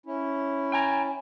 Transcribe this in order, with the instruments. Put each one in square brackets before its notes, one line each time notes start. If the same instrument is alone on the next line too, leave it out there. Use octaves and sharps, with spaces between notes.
[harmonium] C#4 E4
[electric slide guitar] G5 G#5 A#5